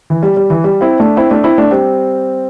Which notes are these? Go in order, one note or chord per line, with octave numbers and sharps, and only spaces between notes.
E3
G3
G3
E3
G3
C4 E4
A3 D4
C4 E4
A3 D4
C4 E4
A3 D4
G3 C4